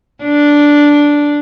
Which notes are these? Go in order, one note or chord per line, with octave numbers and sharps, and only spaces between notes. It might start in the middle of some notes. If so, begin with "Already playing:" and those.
D4